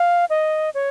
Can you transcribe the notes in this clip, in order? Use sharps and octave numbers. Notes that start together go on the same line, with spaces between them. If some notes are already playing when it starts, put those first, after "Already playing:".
Already playing: F5
D#5
C#5